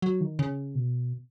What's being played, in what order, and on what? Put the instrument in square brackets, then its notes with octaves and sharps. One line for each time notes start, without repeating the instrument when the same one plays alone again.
[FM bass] F#3
D#3
C#3
B2